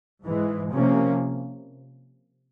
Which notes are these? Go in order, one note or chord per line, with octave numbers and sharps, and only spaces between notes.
G#2 E3 G#3
C3 F3 A#3 C#4